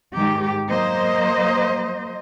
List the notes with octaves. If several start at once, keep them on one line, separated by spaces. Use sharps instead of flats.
G#2 D#3 G4
F#3 A#3 C5 D#5